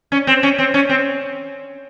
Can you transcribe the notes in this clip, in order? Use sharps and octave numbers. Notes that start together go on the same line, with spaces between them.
C#4
C4
C#4
C4
C#4
C4